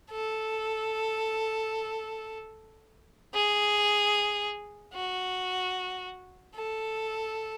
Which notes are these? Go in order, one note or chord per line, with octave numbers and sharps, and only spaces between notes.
A4
G#4
F#4
A4